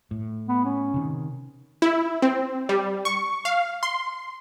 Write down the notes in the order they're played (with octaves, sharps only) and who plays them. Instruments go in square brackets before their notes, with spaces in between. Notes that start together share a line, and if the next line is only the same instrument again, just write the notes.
[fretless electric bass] A2
[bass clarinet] B3
C#4
[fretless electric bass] C3 D#3
[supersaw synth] E4
C4
G3
C#6
F5
C6